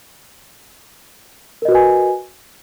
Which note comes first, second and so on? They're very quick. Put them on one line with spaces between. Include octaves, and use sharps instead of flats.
A#4 D#5 F#4 B4 G#5